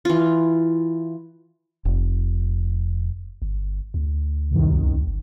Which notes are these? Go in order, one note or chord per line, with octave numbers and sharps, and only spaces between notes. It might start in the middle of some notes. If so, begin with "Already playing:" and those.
E3 F4
F1
G1
D2
C2 F#2 D#3
G1